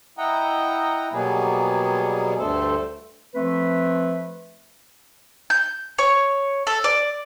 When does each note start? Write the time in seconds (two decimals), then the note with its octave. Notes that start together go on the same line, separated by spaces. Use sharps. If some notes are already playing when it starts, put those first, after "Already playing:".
0.18 E4 D#5 F#5 G5 A#5
1.13 B2 F#3 G3 A#3 B3 G#4
2.39 D2 G2 A3 A4 C5
3.35 F3 A3 C4 B4
5.50 G6
5.99 C#5
6.67 A4
6.84 D5